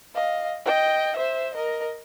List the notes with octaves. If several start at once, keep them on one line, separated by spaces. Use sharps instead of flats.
D#5 F5
D#5 G5
C5 E5
A#4 D#5